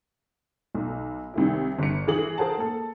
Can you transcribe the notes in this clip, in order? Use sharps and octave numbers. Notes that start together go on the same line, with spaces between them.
B1
C2 D#3 E4
G1 C#7
E3 G#4 F#7
G#4 A#4 C5 F#5 A5
A#3 A4